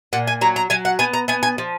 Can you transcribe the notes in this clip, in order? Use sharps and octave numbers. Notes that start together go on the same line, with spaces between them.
A#2 F#5
G#5
F#3 A#5
A#5
F#3 G#5
F#5
B3 G#5
A#5
B3 G#5
G#5
F3